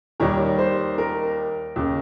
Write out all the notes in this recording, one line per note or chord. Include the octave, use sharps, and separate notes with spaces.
D#2 D#3 G3 A#4 C#5
C5
A#4
D#2 C#3